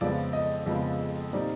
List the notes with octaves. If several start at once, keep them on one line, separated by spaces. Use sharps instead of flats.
F2 C#3 F3 G#3 B3 D5
D#5
F2 C#3 F3 G#3 B3
A#2 G3 C4 D#4 D5